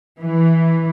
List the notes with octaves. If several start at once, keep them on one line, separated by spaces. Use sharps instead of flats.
E3